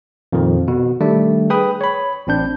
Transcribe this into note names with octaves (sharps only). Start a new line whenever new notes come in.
F2 A#2 D#3 F3
B2
D#3 G3 A3 D4
G#4 B4 G5 B5 D#6
C#5 B5
A1 C4 D4 G6